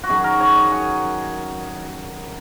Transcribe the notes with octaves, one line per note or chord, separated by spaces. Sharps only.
F#4
F#2 D#3 F#3 G#4
A#4
C#5
D#5
F#5 G#5